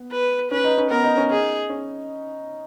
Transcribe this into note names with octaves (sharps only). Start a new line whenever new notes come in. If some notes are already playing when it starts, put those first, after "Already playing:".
Already playing: B3
B4
C#4 B4
D#4
C#4
B3 A#4
D#4
C#4
D#4 G#4
C#4